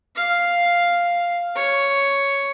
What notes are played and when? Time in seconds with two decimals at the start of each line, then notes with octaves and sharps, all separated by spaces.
0.16 F5
1.56 C#5